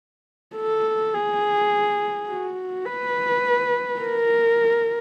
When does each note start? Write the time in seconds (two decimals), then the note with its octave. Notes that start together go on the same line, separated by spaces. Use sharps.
0.56 A4
1.14 G#4
2.28 F#4
2.85 B4
4.00 A#4